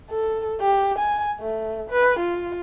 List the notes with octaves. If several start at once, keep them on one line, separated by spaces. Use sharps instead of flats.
A4
G4
G#5
A3
B4
F4